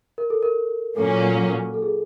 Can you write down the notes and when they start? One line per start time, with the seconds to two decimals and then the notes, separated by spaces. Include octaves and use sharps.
0.18 A#4
0.30 A4
0.43 A#4
0.97 A#2 F#3 A#3 C#4 A4
1.74 A4
1.82 G#4